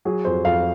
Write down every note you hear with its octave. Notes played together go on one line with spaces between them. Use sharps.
F#3 G#4
F2 C5
F2 F5